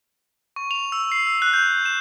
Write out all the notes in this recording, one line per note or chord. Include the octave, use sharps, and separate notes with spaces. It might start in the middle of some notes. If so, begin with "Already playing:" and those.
C#6
F7
E6
C7
E6
F#6
G6
E7